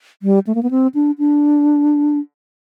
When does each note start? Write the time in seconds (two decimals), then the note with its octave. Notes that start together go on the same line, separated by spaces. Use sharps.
0.22 G3
0.47 A3
0.55 A#3
0.63 B3
0.71 C4
0.94 D4
1.18 D4